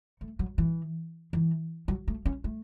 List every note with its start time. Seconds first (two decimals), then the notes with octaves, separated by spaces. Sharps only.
0.21 A3
0.39 F#3
0.58 E3
1.33 E3
1.88 F#3
2.08 A3
2.25 C#4
2.44 A3